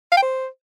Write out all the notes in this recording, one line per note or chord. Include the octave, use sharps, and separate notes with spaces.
F5
G5
C5